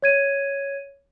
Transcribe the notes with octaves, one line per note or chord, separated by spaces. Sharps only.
C#5 G#6 D#7